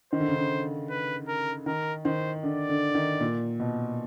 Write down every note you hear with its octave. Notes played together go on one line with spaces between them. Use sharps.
D#3 C5
D3
C#3
D3
B4
A#4
D#3 A#4
D#3 C5
D3 D5
D3
D#3
A#2
B2